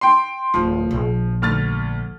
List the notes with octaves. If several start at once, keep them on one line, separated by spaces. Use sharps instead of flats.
G5 C6
D1 F3 F4
A#1
D2 F6 A6